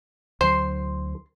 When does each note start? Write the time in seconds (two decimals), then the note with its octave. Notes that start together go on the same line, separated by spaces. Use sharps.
0.41 D2 F#3 C5 C6